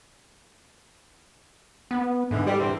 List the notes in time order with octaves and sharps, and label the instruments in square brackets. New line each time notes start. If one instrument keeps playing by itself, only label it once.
[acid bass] B3
[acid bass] G#2 [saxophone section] D3 E3
[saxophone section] G3
D3 E3 C4